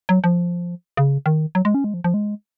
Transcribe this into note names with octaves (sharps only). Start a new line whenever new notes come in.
F#3
F3
C#3
D#3
F#3
G#3
C#4
G#3
F3
F3
G#3